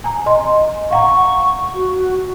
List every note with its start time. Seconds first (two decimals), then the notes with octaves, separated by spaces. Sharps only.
0.04 G#5 A#5
0.26 D#5 C6
0.91 F5 F#5 A#5 C#6
1.74 F#4